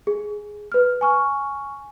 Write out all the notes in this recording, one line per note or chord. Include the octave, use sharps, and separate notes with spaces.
G#4
B4 F6
G#5 C#6 F6